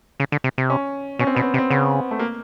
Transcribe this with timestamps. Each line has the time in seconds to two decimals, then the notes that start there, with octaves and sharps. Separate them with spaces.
0.20 C#3
0.32 D3
0.44 C3
0.58 C3
0.70 C#4
1.19 B2 C#4
1.27 C4
1.35 B2 B3
1.42 C4
1.54 C3
1.58 C4
1.70 C#3 B3
2.11 A3
2.19 A#3